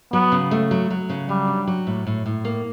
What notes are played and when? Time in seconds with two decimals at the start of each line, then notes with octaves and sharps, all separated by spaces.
0.12 F#3 B3
0.32 C#3
0.51 A3
0.71 F#3
0.90 F#3
1.09 C#3
1.29 F#3 G3
1.48 D4
1.67 F#3
1.87 A2
2.07 A2
2.26 A2
2.45 A#3